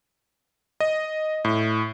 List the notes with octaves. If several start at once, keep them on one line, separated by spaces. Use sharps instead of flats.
D#5
A2